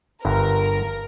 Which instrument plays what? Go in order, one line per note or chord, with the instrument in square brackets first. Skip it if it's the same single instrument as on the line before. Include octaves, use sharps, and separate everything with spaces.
[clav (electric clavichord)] G1 G2 [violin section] A#4